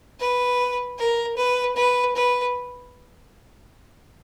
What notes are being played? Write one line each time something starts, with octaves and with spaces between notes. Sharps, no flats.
B4
A#4
B4
B4
B4